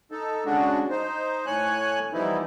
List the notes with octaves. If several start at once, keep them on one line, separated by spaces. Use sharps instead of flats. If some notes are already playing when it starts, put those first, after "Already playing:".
D#4 A4
C#3 G#3 D4 F#4
D#4 C5
A2 C#5 G#5 F#6
E3 F3 G3 B3 D#4 E4